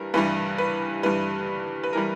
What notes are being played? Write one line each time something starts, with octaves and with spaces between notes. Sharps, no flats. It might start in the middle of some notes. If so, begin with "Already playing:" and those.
Already playing: G2 E3 G3 A#4 B4
G2 E3 G3 B4
B4
G2 E3 G3 B4
B4
E3 G3 A#4